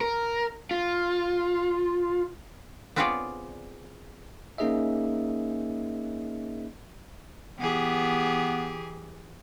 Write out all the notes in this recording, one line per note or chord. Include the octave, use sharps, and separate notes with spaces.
A#4
F4
B3 C4 F4 G#4 C#5 D5
A#3 C#4 D#4 G#4 D#5 E5
E3 B3 G4 G#4